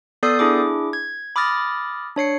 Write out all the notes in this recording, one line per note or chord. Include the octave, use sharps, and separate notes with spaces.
B3 A4 D5 D#6 G6 C7
D4 E4 G#4 D6
G#6
B5 D6 D#6 F6 A6 A#6
D4 C#5 C7 C#7